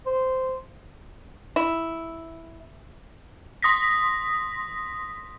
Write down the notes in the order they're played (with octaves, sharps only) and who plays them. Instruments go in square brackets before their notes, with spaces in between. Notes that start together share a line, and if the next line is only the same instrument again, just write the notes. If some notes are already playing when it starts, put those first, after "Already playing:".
[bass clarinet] C5
[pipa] E4
[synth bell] C6 D#6 A#6 B6